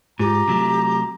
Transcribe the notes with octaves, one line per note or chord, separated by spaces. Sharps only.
G#2 F4 G4 A#5
C3 F#3 A3